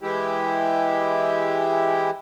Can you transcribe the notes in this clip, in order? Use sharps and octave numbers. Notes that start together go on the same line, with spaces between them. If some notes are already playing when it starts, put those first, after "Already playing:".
E3 G#3 E4 G4